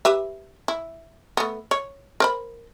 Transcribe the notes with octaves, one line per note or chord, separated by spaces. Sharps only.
G4 B4 E5
E4
A3 B3
C#5
A#4 C5 B5